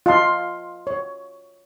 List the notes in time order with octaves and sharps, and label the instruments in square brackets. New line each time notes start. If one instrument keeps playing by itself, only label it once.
[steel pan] F4 D#5 F5 A5 C6
C#5